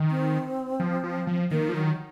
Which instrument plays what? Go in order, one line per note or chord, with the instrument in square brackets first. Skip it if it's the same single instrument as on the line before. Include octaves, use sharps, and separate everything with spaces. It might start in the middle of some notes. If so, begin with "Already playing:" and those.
Already playing: [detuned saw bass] D#3
[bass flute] C4
[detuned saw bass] F3
F3
F3
[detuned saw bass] D#3 [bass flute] A#3
[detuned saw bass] F3
[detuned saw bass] D#3 [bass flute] F#3